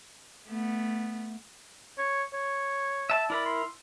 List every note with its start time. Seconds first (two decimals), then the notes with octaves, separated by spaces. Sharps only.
0.48 A3 B3
1.98 C#5
2.33 C#5
3.10 E5 A5
3.30 E4 A#4 D5 B5
3.45 C6